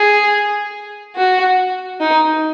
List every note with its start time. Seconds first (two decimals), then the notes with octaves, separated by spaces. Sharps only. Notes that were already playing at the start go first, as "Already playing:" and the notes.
Already playing: G#4
1.16 F#4
2.00 D#4